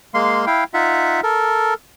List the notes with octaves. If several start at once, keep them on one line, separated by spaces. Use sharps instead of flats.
G#3 A#3 F5 C6
E4 F5 G5
D#4 F4 E5 F#5
A4 A#4